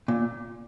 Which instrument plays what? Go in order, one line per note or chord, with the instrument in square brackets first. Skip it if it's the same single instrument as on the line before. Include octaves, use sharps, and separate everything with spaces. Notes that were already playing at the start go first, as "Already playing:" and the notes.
[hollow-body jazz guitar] A#2